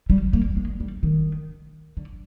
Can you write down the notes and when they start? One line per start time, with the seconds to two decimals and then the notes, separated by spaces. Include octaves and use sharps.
0.10 G3
0.33 A#3
0.56 G#3
0.80 G3
1.03 D#3
1.97 D3